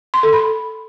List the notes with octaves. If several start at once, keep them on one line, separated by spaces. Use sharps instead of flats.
C6
A4
B5